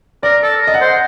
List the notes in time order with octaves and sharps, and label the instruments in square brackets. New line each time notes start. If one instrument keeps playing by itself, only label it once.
[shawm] A#4 [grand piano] D5
[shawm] A4
A#4
[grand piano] D#5
F#5
[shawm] C5